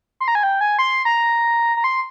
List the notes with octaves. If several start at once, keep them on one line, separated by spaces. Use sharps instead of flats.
C6
A#5
G#5
G5
G#5
C6
A#5
A#5
C6